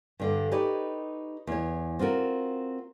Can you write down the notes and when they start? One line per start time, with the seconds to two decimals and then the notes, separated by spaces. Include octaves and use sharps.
0.20 G2 D3
0.51 D#4 G4 B4 C#5 D5
1.47 E2 C#5
1.99 C4 F4 F#4 A#4